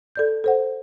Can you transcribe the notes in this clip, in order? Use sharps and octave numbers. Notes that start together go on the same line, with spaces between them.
A4 D5 G6
A4 C5 F#5